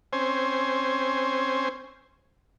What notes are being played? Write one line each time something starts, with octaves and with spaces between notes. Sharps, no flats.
C4 C#4 C5 G#5